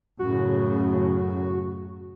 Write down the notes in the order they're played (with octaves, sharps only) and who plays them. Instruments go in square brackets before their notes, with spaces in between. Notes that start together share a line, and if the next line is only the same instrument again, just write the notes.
[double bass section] F#2 A2 C#3 [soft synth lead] F#4